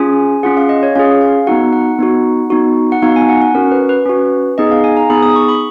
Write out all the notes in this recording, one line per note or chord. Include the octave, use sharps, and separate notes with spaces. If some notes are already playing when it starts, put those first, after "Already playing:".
Already playing: C#4 F4 G#4 G#5
C#4 F4 G#4 F#5
F5
D#5
C#5
C#4 F4 G#4 F5
F5
B3 D#4 F#4 F#5
F#5
B3 D#4 F#4
B3 D#4 F#4
F#5
B3 D#4 F#4 F5
G#5
F#5
F#5
C#4 F#4 A#4
B4
B4
C#4 F#4
B3 D#4 G#4 D#5
F5
G#5
A#5
B3 D#4 G#4 B5
D#6
C#6
B5